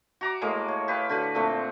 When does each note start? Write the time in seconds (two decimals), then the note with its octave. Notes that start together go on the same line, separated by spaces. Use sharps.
0.21 F#4 A#5 D6
0.41 A2 G#3 A#3
0.68 C#5
0.88 G4 B4 F5
1.09 D3 F#4 B4
1.35 A#2 A3 C4